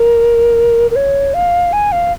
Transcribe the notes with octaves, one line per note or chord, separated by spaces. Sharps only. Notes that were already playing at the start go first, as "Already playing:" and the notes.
Already playing: A#4
A#4
C#5
F5
G#5
F5